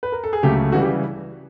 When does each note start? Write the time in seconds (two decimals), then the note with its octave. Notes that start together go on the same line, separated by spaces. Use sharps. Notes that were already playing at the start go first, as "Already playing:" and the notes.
0.03 B4
0.12 A#4
0.24 A4
0.33 G#4
0.43 C#2 C#3 F#3 A3 G4
0.72 C#3 E3 G3 F#4
0.82 G4